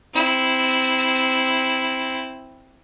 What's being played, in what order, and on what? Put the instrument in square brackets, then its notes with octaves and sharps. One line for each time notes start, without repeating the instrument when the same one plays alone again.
[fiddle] C4 E4